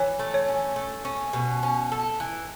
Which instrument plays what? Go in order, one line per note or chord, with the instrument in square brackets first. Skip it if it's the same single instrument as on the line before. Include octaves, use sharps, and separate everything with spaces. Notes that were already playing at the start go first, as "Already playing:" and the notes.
Already playing: [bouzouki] E3 [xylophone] C#5
[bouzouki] A3
[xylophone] C#5
[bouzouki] C#4
A3
C#4
B2
C#4
A4
E3